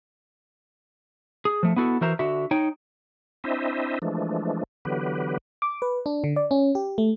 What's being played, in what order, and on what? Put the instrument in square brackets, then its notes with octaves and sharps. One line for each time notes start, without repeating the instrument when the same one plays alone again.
[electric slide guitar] G#4
F3 A3
B3 E4 F#4 A4
E3 F#4 A#4 C5 E5 A#5
D3 F#4 E5
D#4 C#5 G5
[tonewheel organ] C4 D4 E4 C5 D#5 E5
E3 F3 G#3 A3 D4
D3 E3 F#3 B3 G4 B4
[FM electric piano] D6
B4
D4
D3
D5
C#4
G4
A3